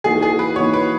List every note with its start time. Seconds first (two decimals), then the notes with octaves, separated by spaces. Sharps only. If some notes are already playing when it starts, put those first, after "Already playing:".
0.04 E3 A#3 D#4 F#4 G#4
0.22 G#4
0.39 B4
0.56 E3 A#3 D#4 F#4 C#5
0.74 B4